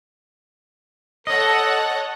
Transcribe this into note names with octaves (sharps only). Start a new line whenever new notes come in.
A4 C#5 D#5 F#5 A5